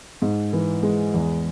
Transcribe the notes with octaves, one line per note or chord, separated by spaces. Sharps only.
G#2
E3
G#3
E2